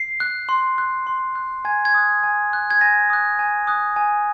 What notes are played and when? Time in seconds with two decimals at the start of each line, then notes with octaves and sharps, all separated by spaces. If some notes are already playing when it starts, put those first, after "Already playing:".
Already playing: C7
0.20 F#6
0.49 C6
0.78 F#6
1.07 C6
1.35 F#6
1.65 G#5 G#6
1.85 G#6
1.94 D#6 F#6
2.24 G#5
2.52 D#6 F#6
2.70 G#6
2.81 G#5 A#6
3.10 D#6 F#6
3.39 G#5
3.67 D#6 F#6
3.96 G#5